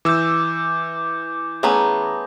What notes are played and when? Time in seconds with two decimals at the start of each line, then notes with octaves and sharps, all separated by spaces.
0.05 E3 D6 E6 G6
1.63 A3 B3 C#4 G#4 A#5 C6